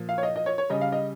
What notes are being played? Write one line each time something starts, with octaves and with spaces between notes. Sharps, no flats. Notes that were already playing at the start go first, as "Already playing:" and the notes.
Already playing: A#2 F3
F5
C#5
D#5
D#5
C#5
C#5
C#3 G3 D#5
F5
D#5